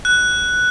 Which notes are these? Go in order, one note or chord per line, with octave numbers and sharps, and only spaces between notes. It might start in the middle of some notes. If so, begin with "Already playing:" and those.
F#6